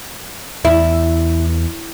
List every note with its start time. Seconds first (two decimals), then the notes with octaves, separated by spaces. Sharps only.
0.65 E2 E4